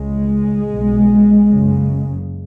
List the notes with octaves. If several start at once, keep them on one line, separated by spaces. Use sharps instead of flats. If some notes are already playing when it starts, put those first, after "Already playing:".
Already playing: C#2 C#3 G#3
B1 B2
F#1 F#2 C#3